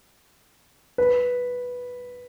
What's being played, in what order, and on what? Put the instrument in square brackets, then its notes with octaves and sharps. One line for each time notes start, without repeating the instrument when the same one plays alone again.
[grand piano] B4